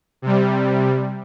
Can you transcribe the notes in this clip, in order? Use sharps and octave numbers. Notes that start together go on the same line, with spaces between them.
C3 G3